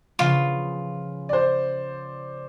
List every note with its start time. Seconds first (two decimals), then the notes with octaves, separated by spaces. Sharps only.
0.19 C#3 F3 B3 F4
1.29 C5 D5